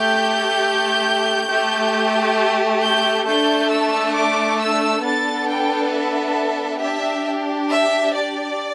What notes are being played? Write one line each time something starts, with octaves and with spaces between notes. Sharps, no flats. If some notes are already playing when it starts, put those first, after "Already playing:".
Already playing: A3 G4 G6
A3 G4
G6
A3 D4 A4 G6
E6
D6
E6
B3 D4 A4 A6
G5
E5
D4 G4 E5
E5
D5